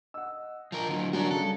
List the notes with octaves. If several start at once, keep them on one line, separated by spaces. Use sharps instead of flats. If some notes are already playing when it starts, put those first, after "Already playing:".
D#5 F#5 E6
F3 A#4
D3 F#3
F#3 G3 D4 F#4 A#4
C#3 A4